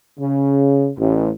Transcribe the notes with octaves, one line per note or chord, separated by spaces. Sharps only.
C#3
A1